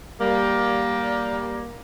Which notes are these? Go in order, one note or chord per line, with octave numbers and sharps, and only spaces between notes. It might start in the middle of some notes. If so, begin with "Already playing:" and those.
G3 A#3